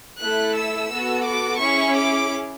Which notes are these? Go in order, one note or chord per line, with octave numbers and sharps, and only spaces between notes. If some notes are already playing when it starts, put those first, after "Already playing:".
A3 E4 A4 F#6
E6
B3 F#4 A4
D6
C#4 E4 G#4 C#6
D6